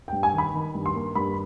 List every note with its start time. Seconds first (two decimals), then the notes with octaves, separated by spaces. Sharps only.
0.08 G5
0.13 G2
0.23 G#5
0.34 D#3 B5
0.54 D#3
0.75 G2
0.86 C6
0.95 A#3
1.15 G2 B5